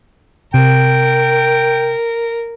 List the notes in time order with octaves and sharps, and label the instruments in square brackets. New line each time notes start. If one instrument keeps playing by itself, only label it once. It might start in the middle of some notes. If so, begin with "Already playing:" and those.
[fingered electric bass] C3 [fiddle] A#4 [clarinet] G5